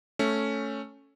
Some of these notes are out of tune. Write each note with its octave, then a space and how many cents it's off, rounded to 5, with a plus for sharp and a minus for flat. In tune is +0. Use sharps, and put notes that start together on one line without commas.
A3 +0 C#4 +0